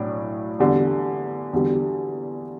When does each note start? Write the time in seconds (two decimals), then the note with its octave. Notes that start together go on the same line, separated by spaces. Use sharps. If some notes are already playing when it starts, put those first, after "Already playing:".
Already playing: B1 A2 F#3 D4 D5
0.59 E2 D3 G3
1.53 E2 D3 G3